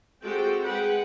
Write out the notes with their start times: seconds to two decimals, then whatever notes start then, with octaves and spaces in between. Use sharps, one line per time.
0.22 G#3 C4 F#4 G4 A4 G5
0.64 G#3 B4 F#5 G5 B5